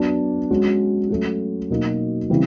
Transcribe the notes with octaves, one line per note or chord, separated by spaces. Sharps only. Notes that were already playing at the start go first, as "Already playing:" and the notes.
Already playing: F#3 B3 D4
G#3 C#4 F#4
F#3 A3 C#4 F#4
B2 F#3 A#3 D#4
C#3 E3 G3 C4